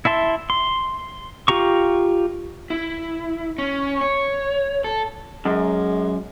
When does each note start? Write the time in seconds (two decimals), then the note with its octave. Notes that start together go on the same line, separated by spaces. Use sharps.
0.05 E4 E5 A5 C6
0.50 C6
1.48 F4 G4 A#5 C#6
2.70 E4
3.58 C#4
4.01 C#5
4.84 A4
5.45 F#2 G#3